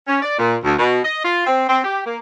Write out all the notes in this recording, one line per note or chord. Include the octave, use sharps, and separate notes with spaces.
C#4
D5
A#2
D2
B2
D#5
F4
C4
C4
G4
A#3